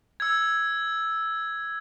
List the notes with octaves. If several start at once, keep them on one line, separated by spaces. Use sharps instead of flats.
E6 G#6